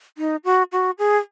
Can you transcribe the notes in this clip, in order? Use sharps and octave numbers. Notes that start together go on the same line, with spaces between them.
D#4
F#4
F#4
G#4